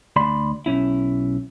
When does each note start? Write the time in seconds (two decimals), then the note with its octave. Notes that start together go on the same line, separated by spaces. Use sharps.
0.16 D2 D5 B5 C6
0.66 B1 C#4 E4